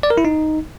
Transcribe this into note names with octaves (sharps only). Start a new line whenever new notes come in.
D5
A#4
E4
D#4